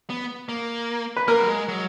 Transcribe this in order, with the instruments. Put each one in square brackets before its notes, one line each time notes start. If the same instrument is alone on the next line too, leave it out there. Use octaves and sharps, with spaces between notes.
[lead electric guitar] B3
A#3
[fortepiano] B4
[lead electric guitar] A#3 [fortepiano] A#4
[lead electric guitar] F#3
G#3
F#3